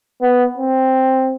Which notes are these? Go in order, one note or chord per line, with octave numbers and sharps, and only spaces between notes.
B3
C4